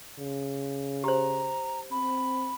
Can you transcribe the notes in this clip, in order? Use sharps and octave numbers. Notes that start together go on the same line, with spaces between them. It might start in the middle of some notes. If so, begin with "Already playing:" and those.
C#3
G4 C5 A#5
C4 B5